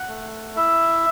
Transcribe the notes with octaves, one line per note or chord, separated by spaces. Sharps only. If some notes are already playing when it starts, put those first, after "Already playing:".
Already playing: F#5
A3
E4 E5